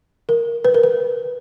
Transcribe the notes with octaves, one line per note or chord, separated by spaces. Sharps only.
A#4
B4
A#4
B4